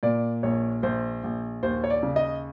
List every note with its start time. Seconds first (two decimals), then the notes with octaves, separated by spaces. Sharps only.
0.03 A#2 D5
0.43 A#1 C#5
0.83 A#1 C5
1.24 A#1
1.63 D#2 C5
1.84 C#5
1.90 D5
2.03 C#3
2.16 D#5